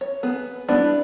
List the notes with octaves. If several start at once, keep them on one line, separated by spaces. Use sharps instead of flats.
C#5
B3 G#4
G3 B3 D4 E4